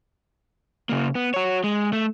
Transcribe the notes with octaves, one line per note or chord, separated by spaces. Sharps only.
C#3 A#3
B3
F#4 C#5
G#3
A3